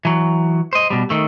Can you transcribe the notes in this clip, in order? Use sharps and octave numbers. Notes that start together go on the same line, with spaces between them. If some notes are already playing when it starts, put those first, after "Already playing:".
E3 F#3
C5 D#5
B2 G3
D#3 A3